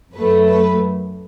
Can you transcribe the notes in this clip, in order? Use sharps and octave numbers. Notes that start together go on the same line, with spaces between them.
F#2 F#3 A3 B4
B4